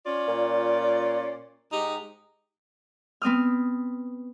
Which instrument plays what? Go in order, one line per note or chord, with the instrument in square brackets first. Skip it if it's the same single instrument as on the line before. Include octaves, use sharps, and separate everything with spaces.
[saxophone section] C#4 F4 D5
[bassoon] A#2
[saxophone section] G#2 D#4 G4
[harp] B3 C4 D#6 F6